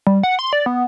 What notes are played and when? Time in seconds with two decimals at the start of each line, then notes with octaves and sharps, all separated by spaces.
0.07 G3
0.23 F#5
0.39 C6
0.53 D5
0.66 B3